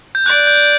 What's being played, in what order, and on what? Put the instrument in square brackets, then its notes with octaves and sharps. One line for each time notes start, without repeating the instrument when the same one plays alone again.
[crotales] G6
[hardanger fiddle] D5 [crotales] F#6
[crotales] G6